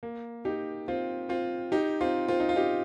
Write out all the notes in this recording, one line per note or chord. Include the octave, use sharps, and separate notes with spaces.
A#3
D#4 G4
C4 F4
C4 F4
D#4 G4
C4 F4
C4 F4
D#4
F4
D#4 G4